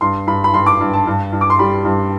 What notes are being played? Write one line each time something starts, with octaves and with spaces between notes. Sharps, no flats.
G2 C6
G2 B5
B5
G2 C6
D6
G2
A5
G2
G2
D6
C6
G3 B5
G2